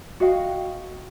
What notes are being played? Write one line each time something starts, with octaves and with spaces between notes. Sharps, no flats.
F#4 D#5 F5 G5